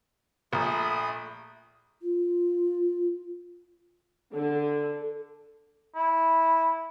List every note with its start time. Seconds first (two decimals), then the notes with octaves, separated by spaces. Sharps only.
0.53 A#1 A3 B5 D#6
2.01 F4
4.34 D3
5.95 E4